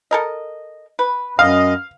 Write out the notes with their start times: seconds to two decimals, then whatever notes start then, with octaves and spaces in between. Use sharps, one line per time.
0.11 A4 A#4 D#5
0.99 B4
1.39 F#2 D#5 F5